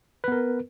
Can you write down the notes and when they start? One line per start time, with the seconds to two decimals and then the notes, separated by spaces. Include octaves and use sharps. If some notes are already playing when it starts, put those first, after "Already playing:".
0.24 B4
0.28 B3
0.32 A#4